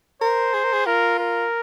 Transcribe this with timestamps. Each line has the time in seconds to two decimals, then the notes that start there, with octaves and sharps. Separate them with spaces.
0.22 A#4 C5
0.54 G#4
0.64 A#4
0.73 G#4
0.86 F4 A#4
1.19 A#4